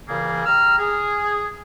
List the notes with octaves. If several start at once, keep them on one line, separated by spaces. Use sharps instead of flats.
A#2 C#3 E3 G3 A#3 G#4
G3 A#5 E6 F6
G#4